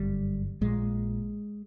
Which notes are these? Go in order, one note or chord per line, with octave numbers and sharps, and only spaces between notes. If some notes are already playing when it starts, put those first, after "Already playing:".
Already playing: G1 F#2 D3 G3
A#1 A#2 G#3